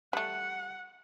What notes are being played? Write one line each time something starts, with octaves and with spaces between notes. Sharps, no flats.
G3 A3 F#5